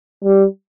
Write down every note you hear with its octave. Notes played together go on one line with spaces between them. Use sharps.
G3